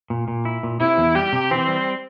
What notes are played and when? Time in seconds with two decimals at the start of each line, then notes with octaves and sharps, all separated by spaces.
0.10 A#2
0.28 A#2
0.45 E4
0.63 A#2
0.80 C3 E4
0.98 E2
1.15 G3 G4
1.33 C3
1.51 E3 C4
1.68 G3